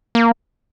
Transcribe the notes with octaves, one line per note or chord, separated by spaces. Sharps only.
A#3